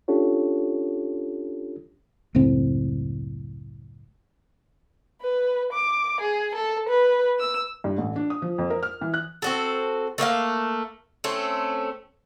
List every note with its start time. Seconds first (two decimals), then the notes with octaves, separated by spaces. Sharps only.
0.08 C#4 D4 F4 G4 A4 C#5
2.35 F#1 C#2 A2 C4
5.22 B4
5.72 D6
6.21 G#4
6.55 A4
6.89 B4
7.39 E6
7.84 G2
7.98 A1
8.16 D4
8.30 D#6
8.42 F3
8.58 F2
8.70 A#4
8.83 F6
9.01 E3
9.14 F#6
9.42 C4 F#4 A4
10.18 A3 A#3 E5 F5
11.24 A3 C4 C#4